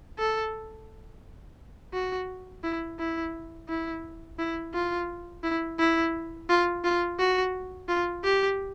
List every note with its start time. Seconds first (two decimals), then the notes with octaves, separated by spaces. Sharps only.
0.19 A4
1.94 F#4
2.64 E4
2.99 E4
3.69 E4
4.39 E4
4.74 F4
5.43 E4
5.79 E4
6.49 F4
6.84 F4
7.19 F#4
7.89 F4
8.24 G4